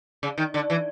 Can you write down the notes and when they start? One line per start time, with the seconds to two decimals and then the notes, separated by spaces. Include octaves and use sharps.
0.23 C#3
0.38 D#3
0.54 D3
0.70 E3